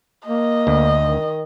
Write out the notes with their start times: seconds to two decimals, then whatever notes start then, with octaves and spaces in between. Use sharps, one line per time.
0.27 A#3 D#5
0.67 D2
1.03 D#3